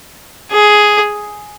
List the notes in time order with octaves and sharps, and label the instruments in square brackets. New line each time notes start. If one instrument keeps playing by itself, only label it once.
[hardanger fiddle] G#4